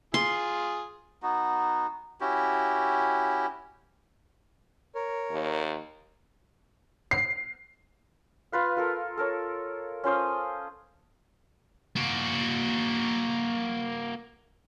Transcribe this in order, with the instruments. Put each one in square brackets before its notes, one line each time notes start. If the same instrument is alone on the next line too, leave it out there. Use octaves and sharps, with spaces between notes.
[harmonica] F4 G#4 [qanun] C6
[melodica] B3 D#4 F#4
C#4 E4 F#4 G4
[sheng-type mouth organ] A#4 C#5
[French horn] D#2
[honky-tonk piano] C7
[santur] F4 B4 F5
F4 A4 A#4
A4 A#4 C#5
C#4 F4 C5 D#6
[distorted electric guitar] A#3 F#4